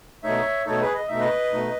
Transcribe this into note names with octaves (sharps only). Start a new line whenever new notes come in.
B2 A3 D#4 C#5 E5
B2 A3 D#4 A4 C#5
G#4 B4
D#5
B2 A3 D#4 E5
B4 D#5
B2 A3 D#4